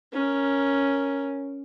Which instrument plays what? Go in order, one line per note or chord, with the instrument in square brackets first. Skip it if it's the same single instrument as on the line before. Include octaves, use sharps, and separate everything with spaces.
[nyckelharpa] C#4 A#4